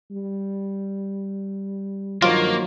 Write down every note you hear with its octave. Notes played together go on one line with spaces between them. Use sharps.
G3
G2 D#3 F3 F#3 A#3 F4